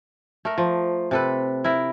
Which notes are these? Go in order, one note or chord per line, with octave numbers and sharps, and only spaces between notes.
A3 A#4
F3
C3 A4 B4
E4 A#4 E5